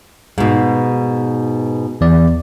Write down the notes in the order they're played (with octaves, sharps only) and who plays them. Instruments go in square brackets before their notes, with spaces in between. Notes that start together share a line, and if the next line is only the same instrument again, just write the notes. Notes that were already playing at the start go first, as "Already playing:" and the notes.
[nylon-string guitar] G#2 B2
[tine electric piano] E2 D5